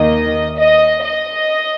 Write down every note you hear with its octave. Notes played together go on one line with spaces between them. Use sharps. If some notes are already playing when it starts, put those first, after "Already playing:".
Already playing: D#2 D#3 A#3 D#5
D#5
D#5